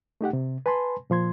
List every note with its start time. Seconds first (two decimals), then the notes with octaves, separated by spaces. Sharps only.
0.21 A3 D#4 G4 F#5
0.33 C3
0.66 B4 G#5 A5 B5 C6
1.10 A#2 F3 C6 G#6